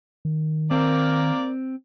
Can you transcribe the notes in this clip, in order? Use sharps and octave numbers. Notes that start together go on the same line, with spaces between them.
D#3
A#3 C4 A#4 D5